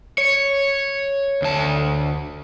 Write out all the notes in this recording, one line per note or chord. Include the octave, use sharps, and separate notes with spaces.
C#5
D2 A5